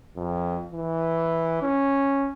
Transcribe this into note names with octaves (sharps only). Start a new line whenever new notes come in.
F2
E3
C#4